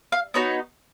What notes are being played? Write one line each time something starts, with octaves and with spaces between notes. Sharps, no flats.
F5
B3 D#4 F#4 C#5